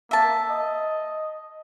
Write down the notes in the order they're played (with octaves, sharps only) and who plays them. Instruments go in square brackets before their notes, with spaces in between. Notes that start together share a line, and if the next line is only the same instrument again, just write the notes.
[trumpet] A#3 [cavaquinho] E5 A5
[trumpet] D#5